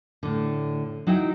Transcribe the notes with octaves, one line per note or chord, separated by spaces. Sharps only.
A2 D3
F#3 D#4 E4 G5